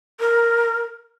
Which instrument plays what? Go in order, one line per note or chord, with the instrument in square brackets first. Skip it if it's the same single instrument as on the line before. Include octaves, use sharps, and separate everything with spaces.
[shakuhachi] A#4